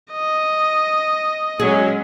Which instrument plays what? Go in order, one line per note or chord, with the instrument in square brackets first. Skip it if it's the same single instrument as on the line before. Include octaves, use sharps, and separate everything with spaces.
[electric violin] D#5
[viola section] F#3 G#3 C#4 [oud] G#4